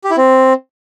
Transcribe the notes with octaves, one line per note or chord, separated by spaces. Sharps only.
G4
E4
C4